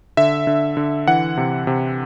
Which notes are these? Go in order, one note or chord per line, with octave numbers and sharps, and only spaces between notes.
D3 E5
D3
D3
E3 F#5
C3
C3